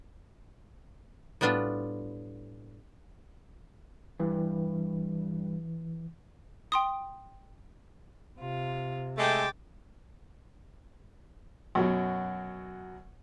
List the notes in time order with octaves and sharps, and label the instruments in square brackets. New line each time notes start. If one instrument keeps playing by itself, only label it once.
[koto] A2 G3 B3 D4 F4
[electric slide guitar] G2 [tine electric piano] E3
[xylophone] G5 C6 D#6
[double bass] C3 [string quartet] F4
[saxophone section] G#3 A3 [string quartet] G5 D6 A6
[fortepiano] F#2 B2 F#3